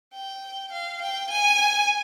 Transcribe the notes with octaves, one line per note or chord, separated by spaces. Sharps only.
G5
F5
G5
G#5